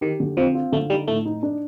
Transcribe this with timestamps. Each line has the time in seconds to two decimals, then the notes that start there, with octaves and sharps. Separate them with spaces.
0.01 D#3 G4
0.20 D3
0.37 F3 C4
0.55 F4
0.72 D3 A3
0.90 G3 D#4
1.08 A2 A3
1.26 D#4
1.43 D4